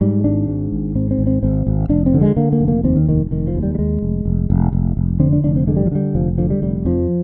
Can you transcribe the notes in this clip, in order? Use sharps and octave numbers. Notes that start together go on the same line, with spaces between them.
G#2 G3
G#1 D4
G#2
G#1
G#2 C4
C4
G#1
C4
G#1 C4
G#1
F1 D4
C4
D3
G#3
D3 A#3
A#3
F1
A#3
D#2 C4
D#3
F1 D#3
F1 D#3
F3
D#2
G3
G3
D#2 G#3
F1
F1
F1
F1
F1
D3 C4
D4
F1 D4
C4
D3 G#3
G3
F3
D3 G3
F1 F3
D3 F3
G3
F1 G3
F2 F3